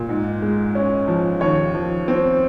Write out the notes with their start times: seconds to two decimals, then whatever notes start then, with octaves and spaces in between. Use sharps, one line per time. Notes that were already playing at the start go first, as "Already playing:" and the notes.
Already playing: A#2
0.09 G#2
0.42 G#3
0.75 C#4
1.08 F3
1.41 D#2 C#5
1.75 F3
2.08 C4